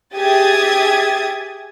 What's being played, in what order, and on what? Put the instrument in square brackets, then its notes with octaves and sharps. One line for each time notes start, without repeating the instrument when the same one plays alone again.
[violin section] G4 G#4 E5 D#6 G#6 A6